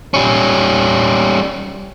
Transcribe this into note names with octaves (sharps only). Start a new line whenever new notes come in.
G3 C#4